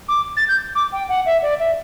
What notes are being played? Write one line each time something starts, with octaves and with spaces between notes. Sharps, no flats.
D6
A6
G6
D6
G5
F#5
E5
D5
E5